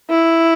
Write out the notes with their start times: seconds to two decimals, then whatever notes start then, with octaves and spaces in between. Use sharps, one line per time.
0.10 E4